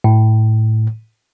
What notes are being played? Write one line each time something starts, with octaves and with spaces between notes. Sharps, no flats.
A2